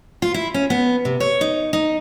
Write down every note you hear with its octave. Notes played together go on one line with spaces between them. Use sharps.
F4
E4
C#4
B3
C3
C#5
D#4
D#4